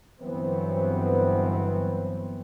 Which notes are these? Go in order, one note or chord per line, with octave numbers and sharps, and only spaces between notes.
G1 G2 E3 F#3 B3 C4